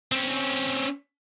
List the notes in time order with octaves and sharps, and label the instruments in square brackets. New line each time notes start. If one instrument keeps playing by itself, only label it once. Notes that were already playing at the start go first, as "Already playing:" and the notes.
[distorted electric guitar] C4 C#4